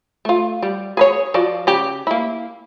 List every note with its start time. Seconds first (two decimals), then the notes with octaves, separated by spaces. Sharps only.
0.25 A3 F4
0.62 G3
0.97 G#4 B4 C#5
1.34 F3 F#4 D5
1.67 C#3 G4
2.07 A#3 E4